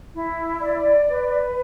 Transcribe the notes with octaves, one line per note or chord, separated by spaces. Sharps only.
E4
D5
B4